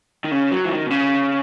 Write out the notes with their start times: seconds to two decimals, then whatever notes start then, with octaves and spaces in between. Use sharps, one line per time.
0.24 D#3
0.31 C#3
0.51 F#3
0.65 E3
0.71 D#3
0.86 B2
0.90 C#3